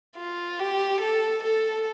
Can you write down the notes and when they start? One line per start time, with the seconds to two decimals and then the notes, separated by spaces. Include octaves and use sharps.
0.17 F4
0.59 G4
1.01 A4
1.43 A4